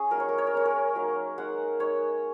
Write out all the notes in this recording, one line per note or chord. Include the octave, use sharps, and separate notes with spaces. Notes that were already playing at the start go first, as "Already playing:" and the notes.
Already playing: C#4 G#4
F#3 A#3 D#4 A#4
C#5
A#4
C#5
A#4
G#3 C#4 C#5
A#4
F#3 A#3 D#4
G#3 D#4 F#5
G#3 D#4 C#5